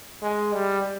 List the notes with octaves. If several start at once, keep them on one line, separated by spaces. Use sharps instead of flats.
G#3
G3